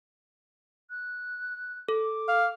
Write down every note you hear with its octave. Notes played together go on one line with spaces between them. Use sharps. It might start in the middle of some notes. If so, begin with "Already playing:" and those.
F#6
A4 D6
F5